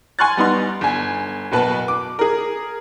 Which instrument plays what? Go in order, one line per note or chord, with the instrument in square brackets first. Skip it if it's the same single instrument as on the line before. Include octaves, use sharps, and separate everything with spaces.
[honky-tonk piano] G#5 C6 C#6 F6 F#6 A6
G3 B3 D#4 C6
G1 G#5
F#1 B2 B4 A5
D6
G#4 A#4